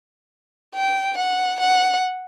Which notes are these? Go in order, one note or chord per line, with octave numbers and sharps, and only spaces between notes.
G5
F#5
F#5